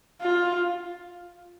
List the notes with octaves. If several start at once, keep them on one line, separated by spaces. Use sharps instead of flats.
F4